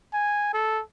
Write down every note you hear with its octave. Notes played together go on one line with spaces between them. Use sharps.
G#5
A4